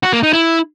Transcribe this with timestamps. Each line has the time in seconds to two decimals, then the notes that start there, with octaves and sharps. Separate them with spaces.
0.03 F#4
0.13 A#3
0.23 D#4
0.33 E4